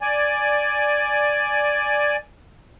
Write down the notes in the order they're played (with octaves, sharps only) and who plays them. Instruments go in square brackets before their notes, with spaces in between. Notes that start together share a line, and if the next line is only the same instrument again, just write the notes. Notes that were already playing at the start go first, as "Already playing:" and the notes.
[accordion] D5 G#5